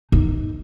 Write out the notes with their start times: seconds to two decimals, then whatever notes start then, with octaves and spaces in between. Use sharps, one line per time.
0.12 D#4